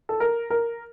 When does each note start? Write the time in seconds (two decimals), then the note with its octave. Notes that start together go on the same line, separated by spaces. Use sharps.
0.09 A4
0.20 A#4
0.50 A#4